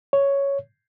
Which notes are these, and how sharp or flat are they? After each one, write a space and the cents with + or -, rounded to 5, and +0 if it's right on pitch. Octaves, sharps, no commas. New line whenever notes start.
C#5 +5